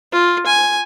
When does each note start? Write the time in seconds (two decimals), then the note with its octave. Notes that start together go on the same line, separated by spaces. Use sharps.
0.12 F4
0.46 G#5